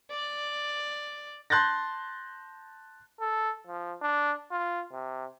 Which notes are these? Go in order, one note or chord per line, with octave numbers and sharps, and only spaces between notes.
D5
A5 C6 F#6 G6 A6 A#6
A4
F3
D4
F4
C3